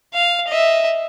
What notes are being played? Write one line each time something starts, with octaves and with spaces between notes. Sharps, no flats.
F5
D#5 E5